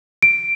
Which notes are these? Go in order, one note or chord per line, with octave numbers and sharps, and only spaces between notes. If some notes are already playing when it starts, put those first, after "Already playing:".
D7